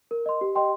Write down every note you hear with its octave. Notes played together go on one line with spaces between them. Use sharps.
A#4
D#5 C6
G4
D#5 G5 C6